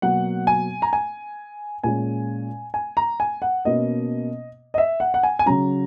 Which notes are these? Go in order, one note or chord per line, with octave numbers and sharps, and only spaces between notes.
B2 F#3 A#3 F#5
G#5
A#5
G#5
A#2 G#3 C#4 G#5
G#5
A#5
G#5
F#5
B2 A#3 C#4 D#5
D#5
E5
F#5
F#5
G#5
G#5
C#3 F#3 C#4 A#5